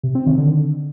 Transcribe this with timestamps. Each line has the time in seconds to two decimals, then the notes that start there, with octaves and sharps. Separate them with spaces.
0.03 C3
0.15 C4
0.26 D#3
0.38 D3